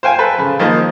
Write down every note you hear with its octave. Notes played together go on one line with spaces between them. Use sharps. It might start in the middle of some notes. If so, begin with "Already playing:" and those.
C5 F5 G5 G#5
A4 B4
C#3
D#3 F3 G#3 A#3